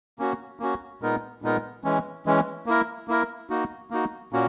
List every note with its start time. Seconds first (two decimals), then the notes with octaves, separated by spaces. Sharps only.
0.19 A#3 C#4 F#4
0.60 A#3 C#4 F#4
1.02 A#2 G#3 B3 D#4 A#4
1.42 A#2 G#3 B3 D#4 A#4
1.84 E3 G#3 C#4
2.26 E3 G#3 C#4
2.66 A#3 E4 A#4
3.08 A#3 E4 A#4
3.50 A#3 D#4 F#4
3.90 A#3 D#4 F#4
4.32 A#2 A#3 C#4 F#4